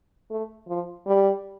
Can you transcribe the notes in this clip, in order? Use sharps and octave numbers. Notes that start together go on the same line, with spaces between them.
A3
F3
G3